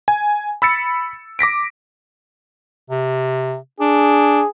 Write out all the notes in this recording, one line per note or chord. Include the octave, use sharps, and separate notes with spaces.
G#5
B5 E6 A6 C#7
D6 A#6 B6 D7
C3
D4 G#4